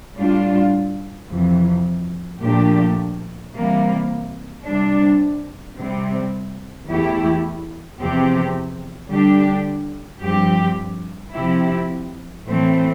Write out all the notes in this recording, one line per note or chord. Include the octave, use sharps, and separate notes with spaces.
A2 G3 D4 F4
F2 C3 E3
A#2 F3 A3 D4 G4
C3 E3 G3 A#3
C3 G3 D4
C3 G3 C4
E2 E3 A3 E4 G4
E2 C3 F3 C4 G4
D3 G3 D4 G4
G2 F3 C4 G4
C3 F3 C4 E4 G4
A2 E3 A3 C4